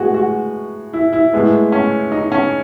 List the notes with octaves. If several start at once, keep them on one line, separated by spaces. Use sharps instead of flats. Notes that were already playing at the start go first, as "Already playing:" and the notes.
Already playing: A2 G#3 B3 F#4 G#4
F#4
E4
E4
A2 G#3 B3
C#4
D#4
C#4